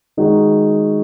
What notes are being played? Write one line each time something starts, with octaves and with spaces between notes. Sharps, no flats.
D#3 G#3 D#4 F#4